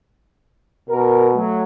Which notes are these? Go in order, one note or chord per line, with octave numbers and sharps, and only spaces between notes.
B2 A#4
F#3 A3